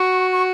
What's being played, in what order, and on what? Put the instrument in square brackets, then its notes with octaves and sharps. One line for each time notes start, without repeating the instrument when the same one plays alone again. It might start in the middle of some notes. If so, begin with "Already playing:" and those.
Already playing: [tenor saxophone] F#4 [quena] C#6
[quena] C#6